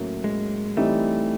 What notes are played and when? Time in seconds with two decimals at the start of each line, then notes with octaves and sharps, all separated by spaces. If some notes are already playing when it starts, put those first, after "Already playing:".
Already playing: A2 F#3 A#3 C#4
0.24 G#3
0.77 E3 G3 A3 C4 D#4